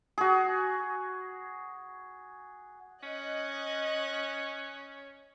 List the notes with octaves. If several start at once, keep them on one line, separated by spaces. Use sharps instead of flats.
F#4 G#4
C#4 D#5 F#6